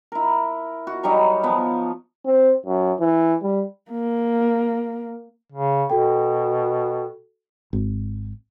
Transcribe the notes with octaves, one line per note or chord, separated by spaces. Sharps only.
E4 A#4
F#4
F#3 G3 D#4 C#5
F3 B3
C4
F#2
E3
G3
A#3
C#3
B2 F#4 A4 G5
G#1